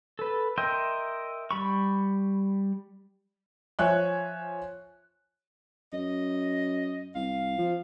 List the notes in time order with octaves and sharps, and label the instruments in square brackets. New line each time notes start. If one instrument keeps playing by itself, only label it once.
[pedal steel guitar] A4 B4
A#4 D#5 E5 G5 C6
G3 B5 C#6
[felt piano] F3 C#5 E5 G#5 F#6
[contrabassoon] F#2 [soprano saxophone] D#5
[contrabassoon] C2 [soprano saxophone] F5
[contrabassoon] F3